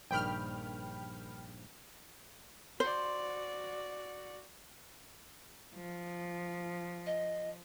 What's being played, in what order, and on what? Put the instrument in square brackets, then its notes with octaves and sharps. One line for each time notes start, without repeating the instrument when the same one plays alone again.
[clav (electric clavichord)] A#1 G2 D#3 [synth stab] G5 B5 F6
[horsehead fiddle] F#4 D5 [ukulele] C5
[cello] F3
[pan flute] D#5